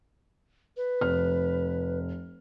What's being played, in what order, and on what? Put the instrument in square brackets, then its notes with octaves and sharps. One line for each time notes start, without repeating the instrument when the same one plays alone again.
[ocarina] B4
[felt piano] F1 F6